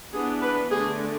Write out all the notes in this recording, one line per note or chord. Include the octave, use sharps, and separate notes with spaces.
E3 B3 D4 G#4
B4
D3 A3 D4 G#4